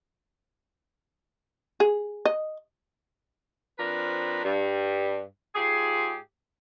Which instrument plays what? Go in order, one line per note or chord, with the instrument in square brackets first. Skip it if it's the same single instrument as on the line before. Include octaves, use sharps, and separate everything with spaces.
[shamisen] G#4
D#5
[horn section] F3 C4 D4 A#4 B4
G2
G#2 F4 G4 G#4